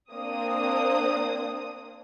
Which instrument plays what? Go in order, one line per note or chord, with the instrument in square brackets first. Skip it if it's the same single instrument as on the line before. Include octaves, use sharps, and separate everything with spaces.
[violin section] A#3 C4 D4 D#6